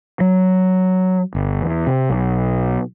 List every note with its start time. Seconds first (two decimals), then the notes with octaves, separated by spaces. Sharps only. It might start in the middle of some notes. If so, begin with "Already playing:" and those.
0.20 F#3
1.35 G1
1.62 E2
1.87 C3
2.10 B1